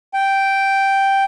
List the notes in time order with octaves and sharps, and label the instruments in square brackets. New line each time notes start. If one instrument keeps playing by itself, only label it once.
[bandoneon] G5